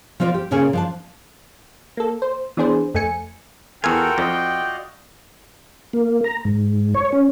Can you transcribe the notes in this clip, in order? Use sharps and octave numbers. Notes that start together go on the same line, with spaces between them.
F3 C4 F4 C#5 D5
G4
A#2 C#3 A#3 C#4 G#4 C#5
F3 D4 A5
A#3 A4
C5
E3 B3 D4 G#4 C5
F2 A3 G#5 C#7
E2 F4 F#4 A4 A#4 G5 G#5
F2 D5 D#5
A#3
A#5
G#2
C#5
C#4